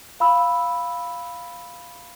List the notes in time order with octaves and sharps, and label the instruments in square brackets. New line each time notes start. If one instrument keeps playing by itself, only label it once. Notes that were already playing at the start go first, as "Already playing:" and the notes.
[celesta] F5 B5 E6